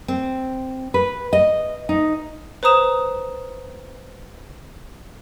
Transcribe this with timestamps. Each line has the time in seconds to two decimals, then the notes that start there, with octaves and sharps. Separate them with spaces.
0.08 C4
0.94 B4
1.33 D#5
1.89 D#4
2.63 B4 C5 A#5 D#6 E7